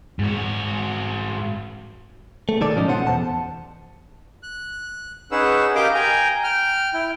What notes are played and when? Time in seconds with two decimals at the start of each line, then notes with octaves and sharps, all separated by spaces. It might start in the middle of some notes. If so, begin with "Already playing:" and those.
0.19 G#2 F#4
2.49 A3
2.61 B1 D#3 A4 D5
2.76 G#2 F3 C#4 D#4
2.88 B2 B3 C5 F#5
3.07 E2 A5
4.43 F#6
5.31 C#4 D#4 G#4 B4 F#5 E6
5.75 G4 A#4 D#5 F5 G5 D6
5.94 G5 G#5 A#5
6.44 G5 F6
6.94 E4 G5